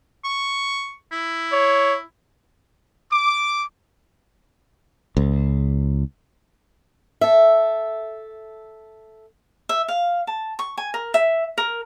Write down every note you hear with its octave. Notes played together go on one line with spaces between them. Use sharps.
C#6
E4
C#5
D6
C#2
A4 E5
E5
F5
A5
C#6
G#5
A#4
E5
A#4